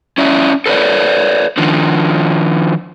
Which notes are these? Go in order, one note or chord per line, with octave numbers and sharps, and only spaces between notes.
C#4 E4 D5 E5
A4 B4 C#5 D5
D#3 F3 D4